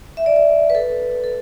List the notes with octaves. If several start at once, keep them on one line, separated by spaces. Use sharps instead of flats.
E5
D5
D5
B4
A4
A4